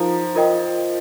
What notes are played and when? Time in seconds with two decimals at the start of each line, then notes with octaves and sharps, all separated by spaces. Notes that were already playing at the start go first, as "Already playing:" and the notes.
Already playing: F3 D#4 A#4 F5 A#5
0.35 F4 A#4 D#5 G5